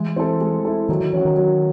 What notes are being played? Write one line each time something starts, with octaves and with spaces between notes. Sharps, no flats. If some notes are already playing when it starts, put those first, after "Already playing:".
Already playing: E3 G#3
C4 E4 A4
G#3
C4 E4 A4
D#3 F#3
D#3
E3 C#4 F#4
D#3
F#3